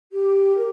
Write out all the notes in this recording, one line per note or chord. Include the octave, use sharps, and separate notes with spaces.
G4
A#4